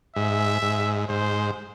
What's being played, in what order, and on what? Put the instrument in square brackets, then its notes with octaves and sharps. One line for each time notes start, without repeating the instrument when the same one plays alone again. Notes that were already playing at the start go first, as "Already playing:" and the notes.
[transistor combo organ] G#2 [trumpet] E5
[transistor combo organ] G#2
[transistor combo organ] G#2 [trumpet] C5